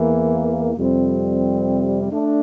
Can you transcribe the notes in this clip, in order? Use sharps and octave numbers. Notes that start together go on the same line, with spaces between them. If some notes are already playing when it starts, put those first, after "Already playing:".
Already playing: E2 E3 A#3
F2 C3 G3 C4
A3 D4